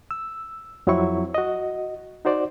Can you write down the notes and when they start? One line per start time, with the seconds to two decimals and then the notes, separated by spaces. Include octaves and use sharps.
0.11 E6
0.87 F2 F#3 C4 E4 C#6
1.34 F#4 D#5
2.25 D#4 F#4 C5 D5